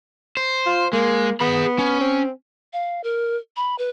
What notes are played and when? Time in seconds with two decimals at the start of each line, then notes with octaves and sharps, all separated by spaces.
0.37 C5
0.66 F4
0.93 G#3 A#3
1.41 B3 G#4 B5
1.79 C#4
2.01 C4
2.73 F5
3.04 A#4
3.56 B5
3.79 B4